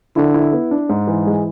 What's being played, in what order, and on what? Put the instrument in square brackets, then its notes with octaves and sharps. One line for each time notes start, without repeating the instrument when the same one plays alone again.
[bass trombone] D3 [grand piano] E4
[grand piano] E4
B3
D4
G#2
E3
G#3